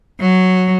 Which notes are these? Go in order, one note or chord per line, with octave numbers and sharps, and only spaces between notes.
F#3